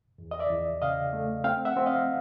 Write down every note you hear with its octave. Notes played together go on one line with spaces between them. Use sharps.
E2
D#5
D5 E5
E2
C#3 D#5 F5
A3
C4 F5 G5
E5 F#5
C4
D#5 F5